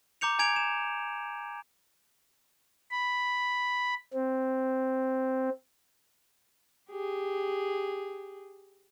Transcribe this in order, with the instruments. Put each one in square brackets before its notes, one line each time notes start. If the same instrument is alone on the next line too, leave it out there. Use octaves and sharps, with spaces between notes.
[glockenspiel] A#5 D6 G6 C#7 F7
G#5 A#5 G#6 D7 F7
E7
[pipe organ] B5
C4
[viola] G4 G#4